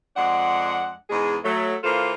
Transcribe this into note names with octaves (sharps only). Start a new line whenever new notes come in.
F2 G#3 D4 F#5
E2 G#2 G#3 G#4
F#3 A3
E3 A#3 F4 A4 C5